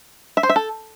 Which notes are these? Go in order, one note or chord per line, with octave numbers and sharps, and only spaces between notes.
E5
C5
E5
A4